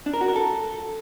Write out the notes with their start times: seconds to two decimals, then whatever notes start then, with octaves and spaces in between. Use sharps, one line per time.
0.06 D4
0.14 A#4
0.21 F#4
0.28 A#4
0.36 A4